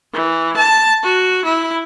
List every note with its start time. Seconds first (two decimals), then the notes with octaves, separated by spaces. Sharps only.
0.13 E3
0.57 A5
1.03 F#4
1.45 E4